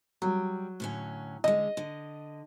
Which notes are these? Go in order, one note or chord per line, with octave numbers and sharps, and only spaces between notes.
F#3 G3
A2 D3 C#4
D3 G#3 D#5
D3